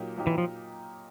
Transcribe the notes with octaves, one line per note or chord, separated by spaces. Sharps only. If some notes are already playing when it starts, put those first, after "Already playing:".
Already playing: A#2 F#3 A#3 D#4 G4
A#2 F#3 A#3 D#4 G4
E3
F3